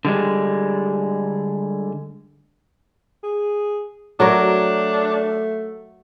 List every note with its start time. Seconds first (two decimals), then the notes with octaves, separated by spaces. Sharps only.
0.05 D3 G3 G#3
3.23 G#4
4.20 F#3 A3 D4 A#4 C#5